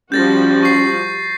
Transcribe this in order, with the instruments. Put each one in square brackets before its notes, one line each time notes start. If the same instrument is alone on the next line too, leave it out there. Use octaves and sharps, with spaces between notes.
[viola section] F3 G3 F#4 [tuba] C#4 [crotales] G6 A6 A#6
[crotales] C#6 C7